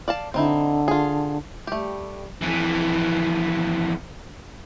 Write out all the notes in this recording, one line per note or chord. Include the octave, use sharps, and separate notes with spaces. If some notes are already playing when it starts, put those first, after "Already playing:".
D5 F5 A5
D3 C4 D#4 E4
F4 G#4
G3 A3 G4
F2 E3